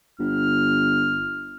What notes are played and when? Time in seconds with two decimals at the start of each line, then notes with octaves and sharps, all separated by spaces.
0.20 G1 F6